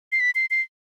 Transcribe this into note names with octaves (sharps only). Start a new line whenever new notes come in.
C7
B6
C7
C7